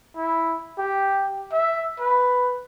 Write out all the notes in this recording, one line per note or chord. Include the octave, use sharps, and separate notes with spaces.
E4
G4
E5
B4